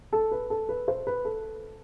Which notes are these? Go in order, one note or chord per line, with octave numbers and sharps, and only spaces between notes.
A4
B4
A4
B4
C5
B4
A4